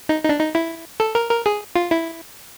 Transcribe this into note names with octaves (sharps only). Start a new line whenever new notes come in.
D#4
D#4
D4
D#4
E4
A4
A#4
A#4
G#4
F4
E4